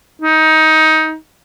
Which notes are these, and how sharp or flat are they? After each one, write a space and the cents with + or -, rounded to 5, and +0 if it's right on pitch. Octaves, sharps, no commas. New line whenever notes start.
D#4 +20